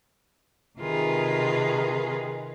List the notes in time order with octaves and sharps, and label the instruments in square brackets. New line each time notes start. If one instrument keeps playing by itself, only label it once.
[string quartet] C3 D#3 F4 G#4 A#4 B4